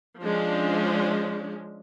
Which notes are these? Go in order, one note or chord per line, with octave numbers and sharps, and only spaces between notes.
F3 G#3 C#4 D4